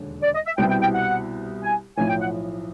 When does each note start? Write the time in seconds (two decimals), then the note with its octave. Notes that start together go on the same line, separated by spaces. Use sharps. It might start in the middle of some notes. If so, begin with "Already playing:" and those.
Already playing: E1 D#2 D3
0.23 D5
0.34 D#5
0.46 E5
0.58 C2 B2 G3 C4 E4 G5
0.70 G5
0.81 G5
0.94 F#5
1.62 G#5
1.98 B1 A2 F3 G#5
2.09 G5
2.21 F#5